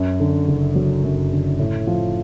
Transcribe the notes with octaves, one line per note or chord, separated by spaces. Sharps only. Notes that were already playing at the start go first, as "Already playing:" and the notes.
Already playing: F#2
D3
F#1
F#3
F#2
D3
A2
F3